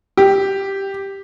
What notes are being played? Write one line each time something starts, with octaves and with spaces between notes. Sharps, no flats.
G4